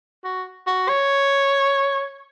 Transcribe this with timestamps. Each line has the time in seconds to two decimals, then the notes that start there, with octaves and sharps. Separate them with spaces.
0.25 F#4
0.67 F#4
0.89 C#5